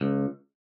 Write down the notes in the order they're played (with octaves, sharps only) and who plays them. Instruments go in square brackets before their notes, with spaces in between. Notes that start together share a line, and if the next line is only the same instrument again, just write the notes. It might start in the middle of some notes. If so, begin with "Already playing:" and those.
[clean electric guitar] C#2